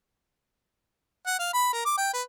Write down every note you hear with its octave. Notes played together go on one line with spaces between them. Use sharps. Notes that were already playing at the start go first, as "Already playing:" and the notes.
F#5
F5
B5
A#4
D6
G5
B4